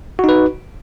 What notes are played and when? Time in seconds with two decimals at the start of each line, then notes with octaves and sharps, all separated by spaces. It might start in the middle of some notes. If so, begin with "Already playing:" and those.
0.19 F#4
0.24 D#4
0.29 B4